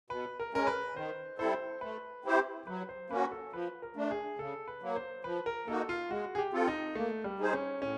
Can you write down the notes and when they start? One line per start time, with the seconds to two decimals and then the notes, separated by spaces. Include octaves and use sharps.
0.10 B2 B4
0.40 A#4
0.53 G#3 C#4 A#4
0.67 B4
0.95 D#3 C5
1.38 G3 C4 E4 A4 C5
1.81 A3 B4
2.25 C4 E4 G4 C5
2.67 F#3 B4
2.89 C5
3.10 A#3 C#4 F#4 B4
3.31 A4
3.53 F3 B4
3.82 A#4
3.96 A3 D4
4.11 G#4
4.39 C#3 A4
4.68 B4
4.82 F#3 A#3
4.96 C5
5.24 F3 B4
5.46 A#4
5.67 A#3 D#4 F#4 A4
5.89 F4
6.10 G#3 F#4
6.35 G#4
6.38 G4
6.53 C4 F4 A4
6.68 D#4
6.95 A3 A#3
7.24 G3
7.39 D#4 G#4 C5
7.53 C#4
7.81 A2 C#4